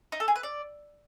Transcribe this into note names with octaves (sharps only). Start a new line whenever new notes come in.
D#4
A4
G#4
B4
D5